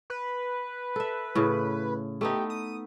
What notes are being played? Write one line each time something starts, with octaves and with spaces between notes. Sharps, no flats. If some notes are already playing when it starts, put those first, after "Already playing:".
B4
A4 E5
A2 C#3
A3 B3 D#4 G4
D#6